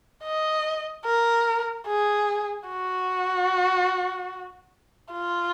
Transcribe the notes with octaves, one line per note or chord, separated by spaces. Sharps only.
D#5
A#4
G#4
F#4
F4